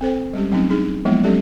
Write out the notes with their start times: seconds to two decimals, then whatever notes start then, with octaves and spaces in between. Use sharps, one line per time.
0.01 C4 A4 C5 G5
0.33 G3 G#3 C#4 G4
0.52 F#3 A3 C4 C#4 D#4
0.70 D4 D#4 G#4
1.05 F3 F#3 G#3 A#3 B3 E4
1.23 F#3 G#3 C#4 G4 A4 D5